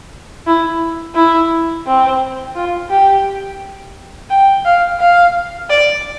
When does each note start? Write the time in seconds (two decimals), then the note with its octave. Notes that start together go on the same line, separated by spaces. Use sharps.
0.47 E4
1.15 E4
1.86 C4
2.56 F4
2.90 G4
4.30 G5
4.65 F5
5.00 F5
5.70 D5